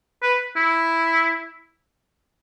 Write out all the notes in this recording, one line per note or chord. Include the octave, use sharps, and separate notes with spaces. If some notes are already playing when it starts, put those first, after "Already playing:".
B4
E4